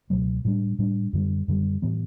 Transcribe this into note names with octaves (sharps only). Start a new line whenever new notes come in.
C#2 B2 F#3 A3
A2 G3 D4
A2 G3 D4
F#2 D3 G3
F#2 D3 G3
A2 E3 B3